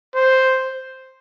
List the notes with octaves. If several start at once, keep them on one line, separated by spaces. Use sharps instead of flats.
C5